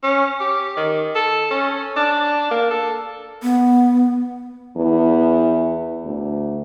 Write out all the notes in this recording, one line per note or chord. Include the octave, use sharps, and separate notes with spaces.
C#4
G4
D#3
A4
C#4
D4
A#3
A4
B3
E2
D2